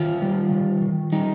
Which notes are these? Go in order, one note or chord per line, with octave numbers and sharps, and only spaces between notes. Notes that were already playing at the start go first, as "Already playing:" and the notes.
Already playing: D#3 F4
G3
D#3
D#3
G3 D#4